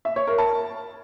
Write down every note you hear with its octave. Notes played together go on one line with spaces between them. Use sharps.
E5
C#5
A#4
A5